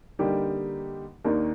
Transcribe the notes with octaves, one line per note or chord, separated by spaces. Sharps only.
D3 G3 A#3 D#4 G4
D#2 D#3 A#3 D4